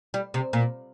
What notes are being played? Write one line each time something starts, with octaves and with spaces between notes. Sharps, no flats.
G3
C3
A#2